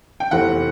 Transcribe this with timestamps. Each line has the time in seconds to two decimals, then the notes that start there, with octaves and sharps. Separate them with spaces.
0.20 G5
0.31 F1 E2 C3 E3 F#5